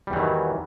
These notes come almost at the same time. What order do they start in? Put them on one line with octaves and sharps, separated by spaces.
G3 E2 E3 D#3 F#3